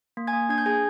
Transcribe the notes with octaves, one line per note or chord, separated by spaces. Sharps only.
A#3
G#5 G#6
A#3
D4 G#6
G6
G#4 G#5 G#6